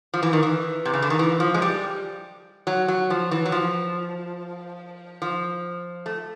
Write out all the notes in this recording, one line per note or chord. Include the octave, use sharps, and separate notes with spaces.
F3
E3
D#3
E3
C3
C#3
D3
D#3
E3
F3
G#3
G3
F#3
F#3
F3
E3
F#3
F3
F3
A3